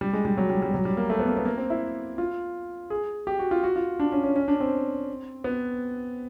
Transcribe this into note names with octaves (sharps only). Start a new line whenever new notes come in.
G3
G#3
G3
F#3
G3
G3
F#3
G3
A#3
A3
B3
A#3
B3
A#3
C4
E4
F4
G#4
G4
F#4
F4
F#4
F4
D4
C#4
C#4
C#4
D4
C4
B3